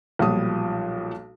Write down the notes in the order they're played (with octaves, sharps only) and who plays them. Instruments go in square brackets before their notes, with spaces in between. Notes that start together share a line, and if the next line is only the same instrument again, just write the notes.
[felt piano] B1 A#2 F3 G3 D#6